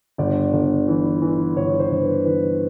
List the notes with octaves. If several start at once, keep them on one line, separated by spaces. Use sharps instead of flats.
G1 D5
G1
E3
E3
G1 C#5
C5
G1
B4
E3 B4